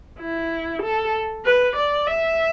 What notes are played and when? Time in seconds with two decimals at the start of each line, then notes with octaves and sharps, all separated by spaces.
0.20 E4
0.83 A4
1.45 B4
1.76 D5
2.07 E5